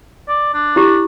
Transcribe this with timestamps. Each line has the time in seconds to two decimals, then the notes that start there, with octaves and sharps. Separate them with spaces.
0.28 D5
0.54 D4
0.76 E4 G4